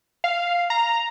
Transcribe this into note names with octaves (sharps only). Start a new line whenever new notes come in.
F5
A#5